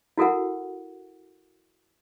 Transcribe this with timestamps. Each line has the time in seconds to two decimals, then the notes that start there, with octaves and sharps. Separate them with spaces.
0.18 E4 F#4 A4 A#4 F#5